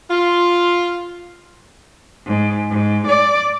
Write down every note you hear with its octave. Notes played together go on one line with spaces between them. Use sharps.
F4
G#2
G#2
D5